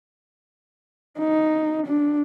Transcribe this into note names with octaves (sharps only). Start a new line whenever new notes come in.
D#4
D4